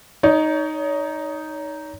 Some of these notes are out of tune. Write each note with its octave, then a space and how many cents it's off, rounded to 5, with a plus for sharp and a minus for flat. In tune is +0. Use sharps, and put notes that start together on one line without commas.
D#4 +0 C#5 +35